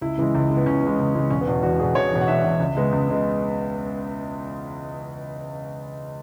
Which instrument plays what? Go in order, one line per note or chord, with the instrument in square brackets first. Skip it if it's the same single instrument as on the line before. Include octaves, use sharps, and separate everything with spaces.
[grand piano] C#2 E4
C#3 E3 G#3
C#2
C#3 E3 G#3
B3
C#2 C#4
C#3 E3 G#3
C#2
C#3 E3 G#3
E1 C#4
B3
E2 B2
E1 F#4
E2 B2 G#4
E1 C#5
E2 B2
F#5
E1 E5
E2 B2
C#2
C#3 G#3 B3
C#2
C#3 G#3 B3